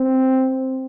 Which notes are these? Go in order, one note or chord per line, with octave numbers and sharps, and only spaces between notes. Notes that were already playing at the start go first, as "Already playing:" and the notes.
Already playing: C4